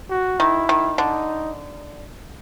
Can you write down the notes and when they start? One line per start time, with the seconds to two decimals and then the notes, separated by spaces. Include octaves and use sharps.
0.10 F#4
0.40 D#3 E4
0.69 D#3
0.98 D3 D#4